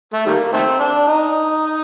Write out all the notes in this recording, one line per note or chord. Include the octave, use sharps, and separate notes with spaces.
A3
D#3 G3 A#3
D#3 A3 C4
D4
D#4